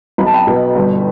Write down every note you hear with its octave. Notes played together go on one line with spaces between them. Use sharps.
B1 B5
A5
G5 B5
B2
G1